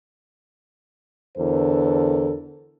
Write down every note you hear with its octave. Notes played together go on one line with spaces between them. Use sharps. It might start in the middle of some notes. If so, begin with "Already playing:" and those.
E2 D3 A4 A#4 C5